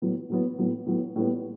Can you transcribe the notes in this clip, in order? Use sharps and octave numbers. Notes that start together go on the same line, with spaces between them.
A2 F#3 B3
A2 F#3 B3
A2 F#3 B3
A2 F#3 B3
A2 G3 B3